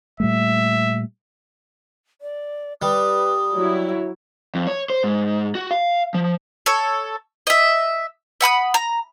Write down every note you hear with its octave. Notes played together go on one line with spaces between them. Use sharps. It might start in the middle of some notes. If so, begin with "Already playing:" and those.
A#2 G3 A3 E5
D5
G3 B4 D#6
F#3 E4 C#5
F2
C#5
C5
G#2
F#4
F5
F3
A4 C#5
D#5 E5
E5 F#5 B5 D#6
A#5